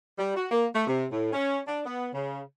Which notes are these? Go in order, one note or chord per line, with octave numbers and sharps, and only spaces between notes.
G3
F#4
A#3
A3
C3
A2
C#4
D4
B3
C#3